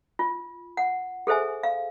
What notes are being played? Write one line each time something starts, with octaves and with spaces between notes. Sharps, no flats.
F4
F#5
G#4 A4 C5 E5 G#5
F5